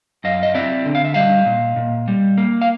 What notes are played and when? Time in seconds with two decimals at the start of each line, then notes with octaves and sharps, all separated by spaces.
0.24 F#2 D#5 F5
0.43 D#5
0.54 C4 D5 E5
0.85 D3
0.95 F5
1.05 E5
1.14 G3 D#5 F5
1.46 A#2
1.76 A#2
2.08 G3
2.38 A#3
2.62 F5